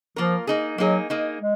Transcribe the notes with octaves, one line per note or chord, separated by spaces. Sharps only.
F3 A#3 F4 A#4
A#3 D#4 G#4
F#3 A#3 D#4 G#4
A#3 D#4 G#4
G#3